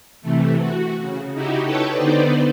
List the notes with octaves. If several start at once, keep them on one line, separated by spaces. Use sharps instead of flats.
C3 E3 A3
F#4
C#3
D#4 E4 F#4 G4
A4 B4 C#5 G5 A5
D3 B3 D#4 B4 C5 D5